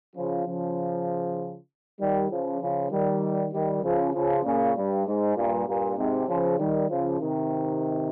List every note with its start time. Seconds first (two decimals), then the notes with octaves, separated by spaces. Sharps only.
0.15 C#3 F3
0.46 C#3 F3
2.00 D#3 G3
2.30 C#3 F3
2.61 C#3 F3
2.91 D#3 G3
3.53 D#3 G3
3.83 C#3 F3
4.13 C#3 F3
4.44 A#2 C#3
4.76 G2
5.06 G#2
5.36 G2 A#2
5.67 G2 A#2
5.97 G#2 C3
6.28 C#3 F3
6.58 D#3 G3
6.89 C#3 F3
7.20 C3 D#3